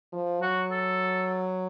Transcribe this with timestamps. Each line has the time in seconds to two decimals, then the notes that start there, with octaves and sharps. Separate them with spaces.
0.13 F3
0.42 F#3 F#4
0.71 A4